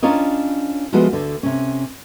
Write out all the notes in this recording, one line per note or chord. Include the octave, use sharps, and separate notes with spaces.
C#4 D4 F4 A#4 C#5 D#5
F3 G#3 A3 B3 F4 F#4
D2 D3
C3 C#4